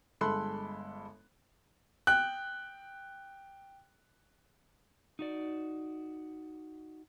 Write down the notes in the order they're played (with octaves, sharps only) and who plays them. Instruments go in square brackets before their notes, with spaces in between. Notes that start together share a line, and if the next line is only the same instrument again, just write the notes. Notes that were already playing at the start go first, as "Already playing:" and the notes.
[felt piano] G1 G#3 A4 B5 C6 F#6
[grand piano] G5 F#6
[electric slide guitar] D#4 F#4 D5